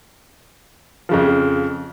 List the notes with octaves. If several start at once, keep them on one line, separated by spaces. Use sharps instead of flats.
F2 C#3 F3